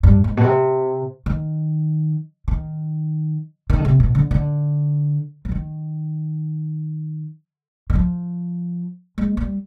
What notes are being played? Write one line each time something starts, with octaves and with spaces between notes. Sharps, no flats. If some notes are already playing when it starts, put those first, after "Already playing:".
G2
G#2
B2
C3
D#3
D#3
D#3
D3
C3
B2
D3
D3
F3
D#3
D#3
F3
G#3
G3